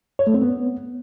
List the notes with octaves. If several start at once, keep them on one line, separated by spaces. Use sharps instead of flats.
C#5
A3
C4
B3